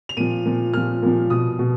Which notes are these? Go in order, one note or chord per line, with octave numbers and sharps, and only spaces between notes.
F7
A#2 F3 D#7
A#2 F3
A#2 F3 F6
A#2 F3
B2 D#6
B2